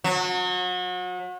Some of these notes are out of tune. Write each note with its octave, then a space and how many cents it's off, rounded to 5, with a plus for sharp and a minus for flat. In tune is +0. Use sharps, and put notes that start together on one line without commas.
F#3 -35